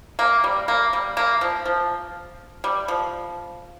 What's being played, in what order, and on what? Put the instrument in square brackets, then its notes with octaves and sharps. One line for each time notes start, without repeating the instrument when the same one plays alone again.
[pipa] A#3
G3
A#3
G3
A#3
F3
F3
G3
F3